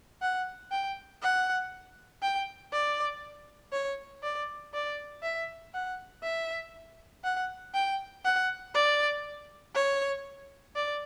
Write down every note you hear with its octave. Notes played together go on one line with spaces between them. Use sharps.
F#5
G5
F#5
G5
D5
C#5
D5
D5
E5
F#5
E5
F#5
G5
F#5
D5
C#5
D5